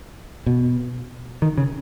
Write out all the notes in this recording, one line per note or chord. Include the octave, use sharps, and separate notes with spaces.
B2
D#3
C#3